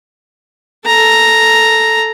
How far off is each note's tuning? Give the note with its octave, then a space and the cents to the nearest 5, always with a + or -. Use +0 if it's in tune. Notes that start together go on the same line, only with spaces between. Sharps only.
A4 +0 A#5 +0